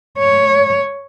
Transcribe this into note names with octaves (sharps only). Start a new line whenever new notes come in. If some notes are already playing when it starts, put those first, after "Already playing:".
C#5